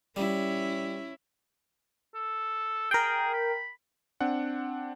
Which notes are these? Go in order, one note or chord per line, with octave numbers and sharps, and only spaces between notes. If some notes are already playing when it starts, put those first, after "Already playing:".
G3 C#4 E4
A4
G#4 A#4 G5
B5
C4 D4 F#5